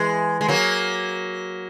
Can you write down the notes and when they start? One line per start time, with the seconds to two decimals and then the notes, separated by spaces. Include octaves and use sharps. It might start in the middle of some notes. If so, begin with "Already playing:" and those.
Already playing: E3 G#3
0.41 G#3
0.48 F#3 A#3